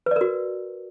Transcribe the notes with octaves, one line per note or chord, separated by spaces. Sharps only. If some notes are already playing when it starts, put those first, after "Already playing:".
F#4 A#4 B4 D5